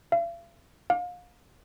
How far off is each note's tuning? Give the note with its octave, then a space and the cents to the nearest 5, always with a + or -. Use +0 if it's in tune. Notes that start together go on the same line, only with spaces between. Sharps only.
F5 -45
F5 +35